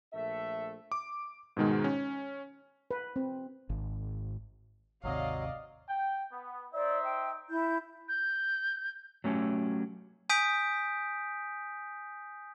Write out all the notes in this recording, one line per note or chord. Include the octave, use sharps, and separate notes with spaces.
A#1 A3 A4 E5
D6
G#2 B2 D#3 G#3
C#4
B4
C4
G#1
G#1 D#2 C3 F#3 D5 D#5 F5
G5
B3
D#4 C5 D5 E5
G5
E4 G6
G6
F#3 A3 C#4 G4
G#5 D#6 G6 B6 D7